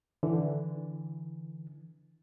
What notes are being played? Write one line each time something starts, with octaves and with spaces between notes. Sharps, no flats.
D3 E3